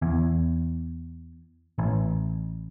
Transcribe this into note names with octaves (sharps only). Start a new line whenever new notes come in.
E2
A1